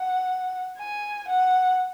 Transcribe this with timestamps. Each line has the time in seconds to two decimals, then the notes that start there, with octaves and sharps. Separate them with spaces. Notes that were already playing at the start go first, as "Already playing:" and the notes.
Already playing: F#5
0.78 G#5
1.28 F#5